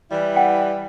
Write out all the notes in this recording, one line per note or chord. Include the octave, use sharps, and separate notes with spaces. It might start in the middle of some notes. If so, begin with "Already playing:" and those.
E3 G3 E4
F#5 G5